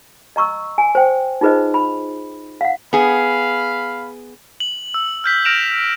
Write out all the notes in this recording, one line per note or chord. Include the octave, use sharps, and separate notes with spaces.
D#5 A#5 C#6 E6
G#5
C5 G5
D#4 F4 G#4 B4 C5 D#5
B5
F5 F#5
B3 G#4 F5 B5
F#7
E6
F6 G6 B6
F6 A#6 D7 E7 F7